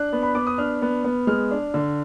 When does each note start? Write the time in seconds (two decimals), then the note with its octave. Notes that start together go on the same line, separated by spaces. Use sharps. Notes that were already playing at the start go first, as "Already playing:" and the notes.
Already playing: D4 F#6
0.13 B3
0.23 B5
0.35 B3 D6
0.47 D#6
0.58 D4 F6
0.82 B3
1.04 B3
1.27 G#3 F6
1.51 D4
1.74 D3